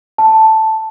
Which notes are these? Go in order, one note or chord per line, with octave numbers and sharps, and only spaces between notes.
A5